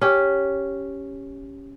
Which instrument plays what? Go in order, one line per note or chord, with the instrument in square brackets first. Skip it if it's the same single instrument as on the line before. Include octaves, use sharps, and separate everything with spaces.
[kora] C#4 G4